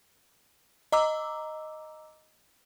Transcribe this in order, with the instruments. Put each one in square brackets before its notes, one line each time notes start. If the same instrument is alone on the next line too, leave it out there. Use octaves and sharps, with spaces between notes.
[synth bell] D#5 A#5 D6 E6